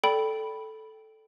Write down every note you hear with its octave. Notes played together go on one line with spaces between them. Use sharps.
A4 D5 G5 B5